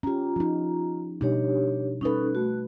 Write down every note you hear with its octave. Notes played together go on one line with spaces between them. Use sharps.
C#4 F4 G4 A#5
F3 D#4
B2 G3 D4 D#4 G4 C#5
G3 C#4 D#4 A4 B4
A3 F#4